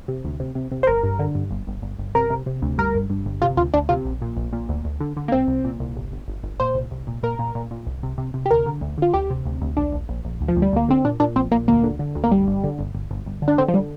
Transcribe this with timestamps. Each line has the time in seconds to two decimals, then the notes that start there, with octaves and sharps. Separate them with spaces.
0.08 C3
0.25 D2
0.40 C3
0.55 C3
0.72 C3
0.83 C5
0.87 G1 A#4
1.03 G2
1.19 D3
1.35 G2
1.51 G1
1.67 G1
1.82 G1
1.99 G1
2.15 C3 A#4
2.30 C3
2.46 C3
2.62 D2
2.78 G2 A#4
2.95 G1
3.10 G2
3.26 G1
3.42 C3 F4
3.57 D2 F4
3.74 D2 D4
3.89 C3 F4
4.05 A#1
4.22 A#2
4.37 A#1
4.53 A#2
4.69 D2
4.85 D2
5.00 D3
5.17 D3
5.28 A#3
5.32 C2 C4
5.48 C2
5.64 A#2
5.80 C2
5.97 G1
6.12 G1
6.28 G1
6.44 G1
6.60 A#2 C5
6.75 C2
6.91 C2
7.07 A#2
7.23 A#2 A#4
7.39 A#2
7.55 A#2
7.71 A#2
7.87 C2
8.03 C3
8.18 C3
8.34 C3
8.46 G4
8.50 D2 A#4
8.66 D3
8.81 D2
8.98 D3 F4
9.14 D2 G4
9.30 C3
9.46 D2
9.62 D2
9.77 A#1 D4
9.93 A#1
10.09 A#1
10.25 A#1
10.41 D2
10.48 F3
10.56 D2
10.62 G3
10.73 D2 A#3
10.88 D3 C4
11.05 A#2 D4
11.20 A#2 D4
11.36 A#1 C4
11.51 A#2 A#3
11.68 D2 A#3
11.84 D3
11.99 D3
12.15 D2
12.24 A#3
12.31 G1 G3
12.48 G1
12.64 D3
12.79 G1
12.95 G1
13.11 G1
13.26 G1
13.42 D3
13.48 D4
13.58 D3 C4
13.68 F3
13.74 D3 G3